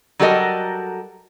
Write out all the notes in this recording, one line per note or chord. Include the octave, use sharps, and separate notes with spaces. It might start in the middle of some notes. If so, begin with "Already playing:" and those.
F#3 G3 F#4 A4 A#4 D#5